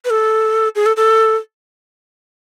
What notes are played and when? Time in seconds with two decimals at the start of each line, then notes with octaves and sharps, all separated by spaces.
0.05 B4
0.10 A4
0.75 G#4
0.86 A4
0.97 A4